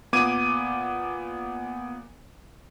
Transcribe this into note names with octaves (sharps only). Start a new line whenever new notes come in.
A#2 B3 D6 G#6 D#7